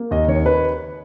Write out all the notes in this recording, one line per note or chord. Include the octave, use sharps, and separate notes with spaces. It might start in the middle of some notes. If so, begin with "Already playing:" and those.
Already playing: A#3
D#2 D#5
D#3 C#5
B4